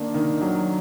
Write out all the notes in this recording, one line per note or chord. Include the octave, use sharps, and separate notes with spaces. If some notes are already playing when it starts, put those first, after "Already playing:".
Already playing: D#3 A#3 D4
D#3
F#3